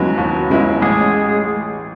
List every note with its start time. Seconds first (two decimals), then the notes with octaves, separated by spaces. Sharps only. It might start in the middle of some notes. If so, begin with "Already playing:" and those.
Already playing: D#2 C#3 F#3 G#3 B3 E4 F#4
0.18 D#2
0.50 C#3 G#3 B3 E4
0.82 A1 G#3 G#4